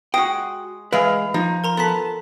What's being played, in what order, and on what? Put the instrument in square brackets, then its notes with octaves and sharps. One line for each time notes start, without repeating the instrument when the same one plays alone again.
[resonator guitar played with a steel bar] G#3 [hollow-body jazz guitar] F#4 G5 [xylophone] D#6
[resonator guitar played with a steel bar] E3 F5 [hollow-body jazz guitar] G#3 B4
[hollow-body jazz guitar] F3 [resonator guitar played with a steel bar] D#4
[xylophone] A#4 A#5 C6
[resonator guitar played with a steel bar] B3 A5 [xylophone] A4 B6